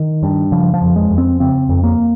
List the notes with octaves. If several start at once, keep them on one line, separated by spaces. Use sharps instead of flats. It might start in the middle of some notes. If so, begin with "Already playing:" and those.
Already playing: D#3
G2
C#3 F3
F3
F2
G#3
F2
C4
C#3 C4
F2
A#3